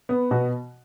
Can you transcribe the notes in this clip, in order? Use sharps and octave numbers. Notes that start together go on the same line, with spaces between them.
B3
B2 F#4